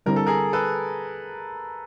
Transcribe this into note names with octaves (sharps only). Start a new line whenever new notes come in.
D3 G3 C4 E4 A#4
A4
G#4 A#4
A4 B4